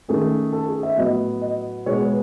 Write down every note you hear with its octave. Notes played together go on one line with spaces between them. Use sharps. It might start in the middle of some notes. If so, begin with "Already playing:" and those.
D#3 A3 C#4 G#4
A4
G#4
E5
A2 F#3 B3 D#5
D#5
B2 G#3 B3 C#5
B4